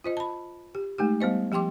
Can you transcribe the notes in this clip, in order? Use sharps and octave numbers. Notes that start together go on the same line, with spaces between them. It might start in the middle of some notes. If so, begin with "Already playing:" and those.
F4 C5 D#5
A5 B5
G4
G#3 A3 D#4 G4
G3 B3 C5 D#5
F3 G4 G5 C6 D6